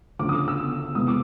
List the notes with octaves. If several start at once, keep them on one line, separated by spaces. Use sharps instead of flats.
D2 C#3 F3 A3 C#4 D6
D#6
E6
E2 C3 E3 G#3 D#6
D6